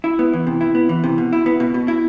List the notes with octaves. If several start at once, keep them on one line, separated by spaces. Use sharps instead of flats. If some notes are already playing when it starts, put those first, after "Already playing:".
E4
B3
E3
C3
E4
B3
E3
C3
B2
E4
B3
B2
B2
E4